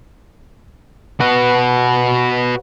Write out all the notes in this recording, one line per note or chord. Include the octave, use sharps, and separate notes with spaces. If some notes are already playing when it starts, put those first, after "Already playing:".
F#4 B4